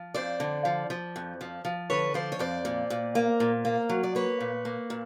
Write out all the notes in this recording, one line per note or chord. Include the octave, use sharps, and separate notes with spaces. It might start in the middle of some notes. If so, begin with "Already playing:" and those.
Already playing: F3
F2 C5 D5
D3
F3
F3
F2
F3
F3
D3 B4 C#5
F3 C5 D5
C#5
F2 C5 D5
A#2
A#2
A#3
A#2
A#3
F#3
D5
A#3 B4 C#5
A#2
A#3
A#2